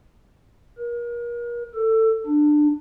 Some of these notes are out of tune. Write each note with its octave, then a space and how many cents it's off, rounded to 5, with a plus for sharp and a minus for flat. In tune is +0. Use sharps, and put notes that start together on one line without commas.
A#4 +35
A4 +20
D4 +20